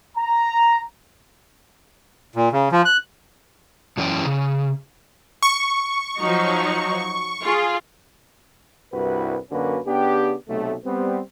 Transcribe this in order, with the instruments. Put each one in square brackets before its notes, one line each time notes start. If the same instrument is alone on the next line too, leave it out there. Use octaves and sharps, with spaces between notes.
[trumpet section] A#5
[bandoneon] A#2
C#3
F3
F#6
[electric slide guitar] F#2 E3 C#4 G4 G5
C#3
[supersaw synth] C#6
[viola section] F3 F#3 D#4
F4 G#4
[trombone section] C2 G2 E4 F#4 B4
F#2 D3 A#3 C#4 F#4 B4
C#3 B3 D4 G4
B1 C3 A3
G3 B3 C4